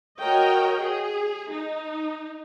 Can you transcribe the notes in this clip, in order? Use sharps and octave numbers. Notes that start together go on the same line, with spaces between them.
F#4 A#4 C#5 D#5 G5
G#4
D#4